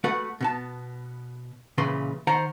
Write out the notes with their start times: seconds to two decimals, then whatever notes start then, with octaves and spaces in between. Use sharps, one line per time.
0.04 A3 F#4 B4 F#5
0.41 B2 B3 A5
1.78 A#2 C#3 E3 B4 C6
2.27 D#3 C5 F#5 A#5